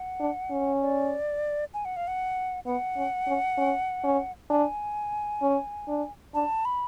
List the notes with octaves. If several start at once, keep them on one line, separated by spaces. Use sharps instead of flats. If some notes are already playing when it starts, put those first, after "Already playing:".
Already playing: F#5
D4
C#4
D5
G#5
F#5
F5
F#5
B3 F#5
C#4
C#4
C#4
C#4
D4 G#5
C#4
D4
D4 A5
B5